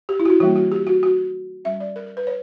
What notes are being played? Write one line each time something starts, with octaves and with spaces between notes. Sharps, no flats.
G4
E4
F#4
E4
E3 G3 A#3 F#4
F#4
G4
F#4
F#4
G3 C#4 E5
D5
A#4
A#4
B4
C#5